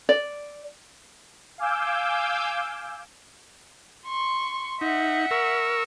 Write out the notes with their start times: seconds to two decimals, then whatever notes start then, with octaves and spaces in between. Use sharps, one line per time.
0.09 D5
1.58 F5 G#5 D6 E6 G6
4.05 C6 C#6
4.81 D#4 E5 F#5
5.31 A#4 C#6 E6